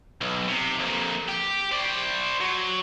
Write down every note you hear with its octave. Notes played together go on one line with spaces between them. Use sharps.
B1
C3
F2 A#2
G4
C5 D5
F#3